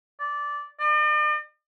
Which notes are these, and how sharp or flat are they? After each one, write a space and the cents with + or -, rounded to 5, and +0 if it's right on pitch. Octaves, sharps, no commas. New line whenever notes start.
D5 -10
D5 +45